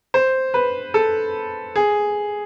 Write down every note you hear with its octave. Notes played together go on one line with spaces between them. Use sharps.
C5
B4
A4
G#4